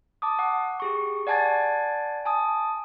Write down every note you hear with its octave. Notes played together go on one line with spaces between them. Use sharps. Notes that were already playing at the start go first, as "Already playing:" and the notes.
A5 D6 D#6
F#5
G4 G#4 C#6
D5 F#5 G#5 A5 G#6 A6
G#5 A5 D#6